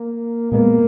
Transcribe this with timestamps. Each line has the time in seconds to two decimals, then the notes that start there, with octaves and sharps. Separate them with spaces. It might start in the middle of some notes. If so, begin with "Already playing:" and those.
Already playing: A#3
0.52 A#2 G#3 A#3 B3